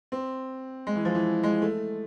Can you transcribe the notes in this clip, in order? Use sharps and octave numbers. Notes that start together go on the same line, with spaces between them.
C4
G#3
E3
F3
E3
G#3
A3